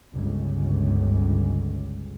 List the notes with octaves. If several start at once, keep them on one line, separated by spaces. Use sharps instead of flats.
G1 C#2